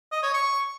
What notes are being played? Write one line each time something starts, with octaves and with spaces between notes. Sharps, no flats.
D#5
C#5
C#6